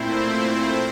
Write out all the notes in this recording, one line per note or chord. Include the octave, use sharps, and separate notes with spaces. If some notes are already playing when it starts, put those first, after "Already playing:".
Already playing: A#2 A3 C4 E4 C5